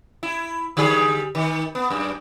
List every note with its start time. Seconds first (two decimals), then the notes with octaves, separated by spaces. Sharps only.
0.23 E4
0.77 D3 G3 G#4
1.35 D#3
1.75 B3
1.90 F#2